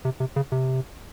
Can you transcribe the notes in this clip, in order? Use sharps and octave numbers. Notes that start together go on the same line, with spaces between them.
C3
C3
C#3
C3